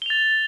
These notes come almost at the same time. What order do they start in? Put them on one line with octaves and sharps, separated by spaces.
G7 F7 A6